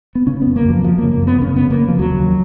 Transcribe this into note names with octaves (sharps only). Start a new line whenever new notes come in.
B3
C#3 C#4
F#2 B3
A#3
F#2 F3
F#2 F3
A#3
C#3
A#3
F#2
B3
C#3 C#4
C#3 B3
A#3
C#3
F3
D#2 F#3
D#2